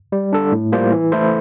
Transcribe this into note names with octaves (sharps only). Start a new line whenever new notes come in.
G3
D4 A4
A2
G3 A#3 F4 C5
E3
A3 E4 A4 C5